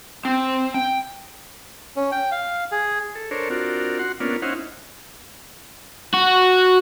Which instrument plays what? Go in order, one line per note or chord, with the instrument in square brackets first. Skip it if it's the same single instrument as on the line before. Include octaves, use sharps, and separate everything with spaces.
[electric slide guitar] C4
G5
[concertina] C#4
G5
F5
G#4
[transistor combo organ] A4
D4 A4 A#4 C5 C#5
C4 D4 F4 F#4 A#4
F#4 F#5 C6
A#3 B3 C#4 D4 F4
C#4 D#4 E4 C5 F5 F#5
[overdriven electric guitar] F#4